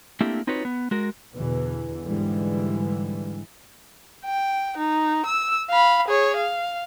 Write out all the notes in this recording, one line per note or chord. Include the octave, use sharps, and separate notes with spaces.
A3 A#3 C4 D4 E4 G4
C4 D#4 F4 F#4 B4 C#5
B3
G#3 F#4 A#4
E2 B2 D3 E3
G#2 D3 E3 G3 G#3
G5
D#4
E6
F5 B5
G#4 C#5
F5